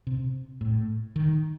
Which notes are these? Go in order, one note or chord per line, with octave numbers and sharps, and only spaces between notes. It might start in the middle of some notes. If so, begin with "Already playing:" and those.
C3
A2
D#3